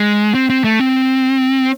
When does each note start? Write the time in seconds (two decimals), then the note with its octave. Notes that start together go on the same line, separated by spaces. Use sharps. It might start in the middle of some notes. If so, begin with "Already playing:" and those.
Already playing: G#3
0.34 C4
0.50 C4
0.64 A3
0.80 C4